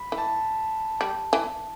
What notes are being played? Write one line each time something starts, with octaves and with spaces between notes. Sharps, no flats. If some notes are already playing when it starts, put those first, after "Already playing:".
Already playing: B5
E3
A5
G3
E3